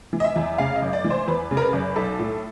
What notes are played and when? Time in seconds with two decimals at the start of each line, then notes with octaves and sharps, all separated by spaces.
0.13 E3
0.20 D#5
0.24 E5
0.36 E2
0.58 C#3 F5
0.76 D#5
0.82 F#1
0.93 D5
1.04 E3
1.10 C5
1.28 E2 B4
1.51 C#3
1.57 A#4
1.62 B4
1.73 F#1
1.96 B1 A4
2.19 A2